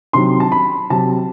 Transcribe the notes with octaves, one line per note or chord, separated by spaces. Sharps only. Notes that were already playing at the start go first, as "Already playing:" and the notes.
C3 D#3 F#3 C6
A5
B5
C3 F#3 A5